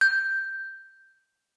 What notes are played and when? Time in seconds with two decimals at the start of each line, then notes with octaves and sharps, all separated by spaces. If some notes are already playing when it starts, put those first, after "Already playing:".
0.01 G6